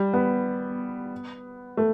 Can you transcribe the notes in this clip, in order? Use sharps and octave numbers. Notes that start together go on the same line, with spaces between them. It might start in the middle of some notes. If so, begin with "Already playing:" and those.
Already playing: G3
B3
A3